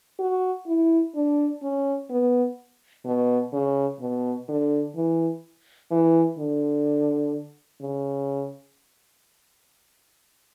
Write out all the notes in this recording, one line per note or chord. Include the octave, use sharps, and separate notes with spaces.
F#4
E4
D4
C#4
B3
B2
C#3
B2
D3
E3
E3
D3
C#3